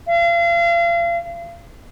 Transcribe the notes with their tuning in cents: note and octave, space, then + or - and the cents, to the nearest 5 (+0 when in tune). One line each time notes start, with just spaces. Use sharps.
F5 -35